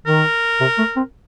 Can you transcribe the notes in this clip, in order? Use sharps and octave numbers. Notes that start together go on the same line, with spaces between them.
D#3 A#4
C3
A3
C4